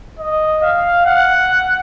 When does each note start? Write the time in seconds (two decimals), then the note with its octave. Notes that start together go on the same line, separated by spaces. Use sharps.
0.19 D#5
0.63 F5
1.06 F#5